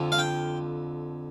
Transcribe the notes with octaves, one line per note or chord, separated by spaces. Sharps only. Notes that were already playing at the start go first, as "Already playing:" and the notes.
Already playing: F2 D3 F3
F5
G5